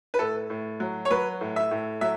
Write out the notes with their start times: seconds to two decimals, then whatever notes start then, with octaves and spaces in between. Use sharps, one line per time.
0.14 B4
0.19 A2 A4
0.50 A2
0.80 F#3
1.05 C#5
1.10 F#3 B4
1.41 A2
1.56 E5
1.71 A2
2.01 F#3 E5